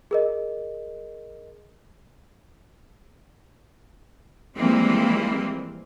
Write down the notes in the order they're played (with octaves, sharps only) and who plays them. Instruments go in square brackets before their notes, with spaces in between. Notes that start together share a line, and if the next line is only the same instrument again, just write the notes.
[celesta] G#4 A#4 D#5
[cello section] E3 F3 G3 G#3 A#3 C4